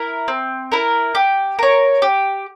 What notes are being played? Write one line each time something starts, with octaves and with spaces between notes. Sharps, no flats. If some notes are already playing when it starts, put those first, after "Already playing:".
Already playing: E4 A#4
C4
E4 A#4
G4
A#4 C#5
G4